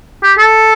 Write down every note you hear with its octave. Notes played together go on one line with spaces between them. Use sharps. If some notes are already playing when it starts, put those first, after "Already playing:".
G4
A4